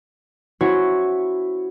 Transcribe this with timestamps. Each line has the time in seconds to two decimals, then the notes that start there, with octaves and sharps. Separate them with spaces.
0.61 C#4 E4 F#4 C5 C#5